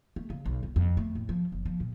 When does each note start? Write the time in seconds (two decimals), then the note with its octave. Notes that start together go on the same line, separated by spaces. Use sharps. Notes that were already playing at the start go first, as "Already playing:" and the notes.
0.16 A3
0.30 C#3
0.46 B1
0.63 E2
0.76 F2
0.97 A3
1.15 A2
1.29 F3
1.52 F#1
1.66 F3
1.80 A#2